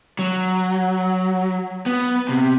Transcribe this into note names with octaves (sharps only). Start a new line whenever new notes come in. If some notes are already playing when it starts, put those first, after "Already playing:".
F#3
B3
C3